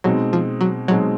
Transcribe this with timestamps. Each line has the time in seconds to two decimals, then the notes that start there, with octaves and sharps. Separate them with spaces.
0.04 B2 F#3 G#3 C4 D#4
0.33 F3
0.61 F#3
0.88 B2 F#3 G#3 C4 D#4